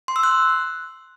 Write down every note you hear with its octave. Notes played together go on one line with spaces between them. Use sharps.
C6
E6
F#6